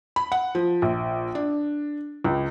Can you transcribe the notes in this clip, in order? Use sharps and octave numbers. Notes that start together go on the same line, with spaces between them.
B5
F#5
F3
A#1
D4
C#2